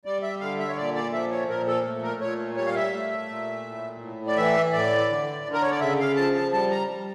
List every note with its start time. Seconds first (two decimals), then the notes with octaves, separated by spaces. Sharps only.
0.05 G3 D5
0.23 E5
0.40 D3 F5
0.59 E5
0.68 C#5
0.77 A#2 D5
0.95 D5
1.13 F3 E5
1.31 C#5
1.49 A#2 A#4
1.67 A4
1.85 A3
2.03 A#4
2.21 A#2 C#5
2.57 G3 C#5
2.67 F5
2.75 E5
2.93 A3
3.28 A#2
3.65 A2
4.01 A2
4.27 D5
4.37 E3 E5
4.73 A2 D5
5.09 D3
5.45 D3
5.53 A#4
5.62 C#5
5.71 D5
5.80 C#3 E5
5.99 F5
6.16 F3 A5
6.35 A5
6.52 G3 A5
6.71 A#5
6.89 G3